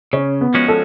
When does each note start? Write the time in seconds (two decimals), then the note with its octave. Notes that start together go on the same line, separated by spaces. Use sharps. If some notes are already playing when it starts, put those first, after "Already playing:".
0.13 C#3 C#4
0.41 B3
0.54 F3 G#3 C#4 F#4
0.68 A4